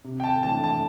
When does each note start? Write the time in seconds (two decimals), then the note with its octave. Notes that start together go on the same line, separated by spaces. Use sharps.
0.04 C3
0.20 G5
0.24 A5
0.43 E3 A3 D4 A5
0.64 A5